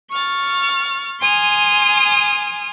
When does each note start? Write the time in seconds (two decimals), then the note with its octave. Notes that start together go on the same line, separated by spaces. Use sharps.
0.11 C#6 F6 A6
1.22 G#5 C6 D#6 F6